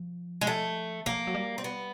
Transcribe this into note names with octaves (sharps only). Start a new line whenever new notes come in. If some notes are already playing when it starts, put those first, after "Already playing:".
Already playing: F3
G#3
A3
F3 A#3
F#3
G3
C4
B3